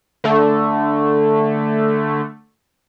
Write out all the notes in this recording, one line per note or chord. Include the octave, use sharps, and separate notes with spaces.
D3 A3